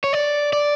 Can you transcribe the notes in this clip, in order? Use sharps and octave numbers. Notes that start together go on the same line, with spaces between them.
C#5
D5
D5